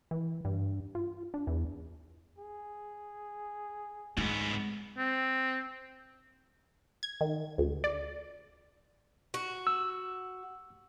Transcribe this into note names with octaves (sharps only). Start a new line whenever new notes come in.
E3
G2
F4
D4
E2
G#4
G#2 G#3 B3
C4
G#6
D#3
D2
D5
F#4
E6